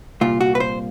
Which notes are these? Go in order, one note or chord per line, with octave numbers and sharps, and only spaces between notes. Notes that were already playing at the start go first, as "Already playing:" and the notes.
C2 A#2 F4
F#4
B4
C5